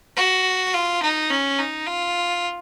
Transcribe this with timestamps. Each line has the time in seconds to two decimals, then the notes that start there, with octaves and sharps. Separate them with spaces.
0.17 F#4
0.74 F4
1.02 D#4
1.30 C#4
1.59 D#4
1.87 F4